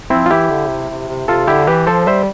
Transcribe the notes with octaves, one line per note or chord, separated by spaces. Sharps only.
F3 C4 E4
F4
E3 E4 G4
D3
C3
C3
C3
C3 F4 A4
D3 E4 G4
E3 G4 B4
F3 A4 C5
G3 C5 E5